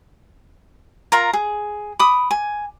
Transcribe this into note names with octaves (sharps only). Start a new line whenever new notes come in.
F4 A#4 A#5
G#4
B5 D6 D#6
G#5